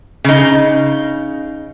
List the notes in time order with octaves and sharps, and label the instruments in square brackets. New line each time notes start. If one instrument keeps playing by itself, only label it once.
[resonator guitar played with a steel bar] C#3 D#4